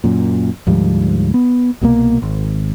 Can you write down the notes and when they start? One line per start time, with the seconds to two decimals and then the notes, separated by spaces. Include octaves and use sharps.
0.04 F#2 A#2
0.67 D2 G#2 F3 G3
1.34 B3
1.81 C2 B2 E3 A#3
2.22 G#1